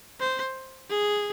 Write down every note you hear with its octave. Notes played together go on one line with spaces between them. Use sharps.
C5
G#4